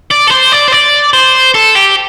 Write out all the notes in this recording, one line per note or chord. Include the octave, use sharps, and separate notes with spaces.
D5
A4
C5
D5
C5
D5
C5
A4
G4